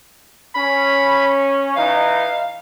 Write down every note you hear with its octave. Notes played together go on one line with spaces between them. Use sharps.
C#4 B5
E3 D#4 F5